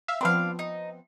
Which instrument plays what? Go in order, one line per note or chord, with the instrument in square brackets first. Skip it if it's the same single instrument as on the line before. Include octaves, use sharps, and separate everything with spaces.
[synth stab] E5 F5 E6
[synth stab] F3 B3 C4 [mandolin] D4 F5
[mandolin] D#4